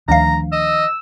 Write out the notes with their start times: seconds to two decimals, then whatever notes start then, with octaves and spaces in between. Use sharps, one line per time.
0.08 D2 D#3 F3 D4 F5 A#5
0.52 D#5 E6